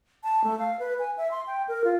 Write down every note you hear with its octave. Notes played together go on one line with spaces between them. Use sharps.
A5
A3
F5
B4
G#5
E5
C6
G5
A#4
F4